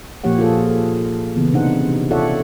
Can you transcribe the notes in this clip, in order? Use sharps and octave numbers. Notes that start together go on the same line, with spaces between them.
A#2 F3 A#3 G4 C#5 F#5
F4 G#4 A4
C#3 E3 B3
C3 D4 D#4 C5 F#5
F4 A4 C#5 D5 E5 F#5